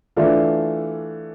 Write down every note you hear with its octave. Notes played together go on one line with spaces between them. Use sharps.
E3 A3 D4 F4